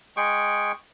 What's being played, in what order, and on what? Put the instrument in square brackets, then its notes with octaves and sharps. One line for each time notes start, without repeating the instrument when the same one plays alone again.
[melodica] G#3 G#4 G5 C#6